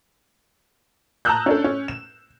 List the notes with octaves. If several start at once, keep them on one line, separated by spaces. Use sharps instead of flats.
A5 A#5 D#6 E6 F#6 G6
C#4 D4 A4
C#4
E7